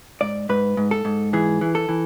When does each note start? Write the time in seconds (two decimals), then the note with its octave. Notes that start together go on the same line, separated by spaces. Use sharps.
0.21 G#2 D5
0.49 G#2 B4
0.77 G#2
0.91 A4
1.05 G#2
1.33 E3 G#4
1.61 E3
1.75 A4
1.89 E3